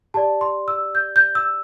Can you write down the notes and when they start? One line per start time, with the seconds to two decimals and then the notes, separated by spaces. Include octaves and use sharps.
0.14 G4 D5 A5
0.41 C6
0.68 E6
0.95 G6
1.16 G6
1.35 E6